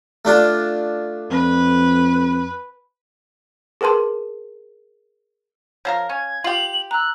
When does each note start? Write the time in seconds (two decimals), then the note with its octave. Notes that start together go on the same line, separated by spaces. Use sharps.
0.25 A3 D4 F4
1.31 F2 B4
3.81 G#4 A#4 B4 A5 C6
5.85 F3 A4 A#4 C#5 F5
6.09 C#4 G#6
6.44 F4 G4 F#7
6.91 A#5 E6 F#6